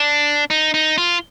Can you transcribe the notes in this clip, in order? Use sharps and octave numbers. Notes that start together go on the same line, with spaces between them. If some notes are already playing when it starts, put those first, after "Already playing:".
Already playing: D4
D#4
D#4
F4